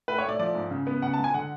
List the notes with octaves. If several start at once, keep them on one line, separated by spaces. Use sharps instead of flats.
A3 B4
C#5
A3 D5
F3 D5
G#2
C#3
B3
C#3 F#5
A5
G#3
G#5
D3 F#5